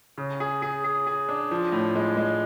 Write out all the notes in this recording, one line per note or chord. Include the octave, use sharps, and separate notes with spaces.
C#3
G#4
G#4
G#4
G#4
D4
F3
A2
G#3
G#3